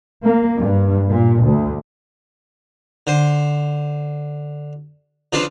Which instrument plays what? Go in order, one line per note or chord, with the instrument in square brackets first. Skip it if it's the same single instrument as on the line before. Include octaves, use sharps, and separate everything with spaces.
[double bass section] A#3
G2
A#2
D2
[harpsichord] D3 C5
C#3 F3 D4 F4 B4